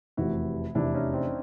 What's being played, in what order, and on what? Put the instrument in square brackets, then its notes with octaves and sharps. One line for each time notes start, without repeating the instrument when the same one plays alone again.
[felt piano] F1 E2 C3 E3 [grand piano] E4 F#4
[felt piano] F1 E2 C3 E3 [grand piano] D4 E4
[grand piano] C#4 D#4
C4 D4